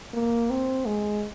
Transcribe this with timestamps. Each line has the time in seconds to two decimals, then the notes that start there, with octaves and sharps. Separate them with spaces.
0.14 A#3
0.50 C4
0.86 G#3